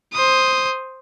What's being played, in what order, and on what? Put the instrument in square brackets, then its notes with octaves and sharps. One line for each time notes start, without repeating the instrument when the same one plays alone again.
[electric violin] C5 D#6